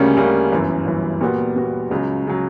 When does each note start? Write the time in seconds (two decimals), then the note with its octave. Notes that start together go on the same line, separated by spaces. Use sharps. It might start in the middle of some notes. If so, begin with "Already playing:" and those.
Already playing: D2 C#3 G3 A#3 C#4
0.17 D2 C#3 G3 A#3 C#4
0.52 G1 F#2 E3
0.86 G1 F#2 E3
1.21 A#2 G3 B3 F#4
1.56 A#2 G3 B3 F#4
1.91 C#2 C#3 F#3
2.27 C#3 F#3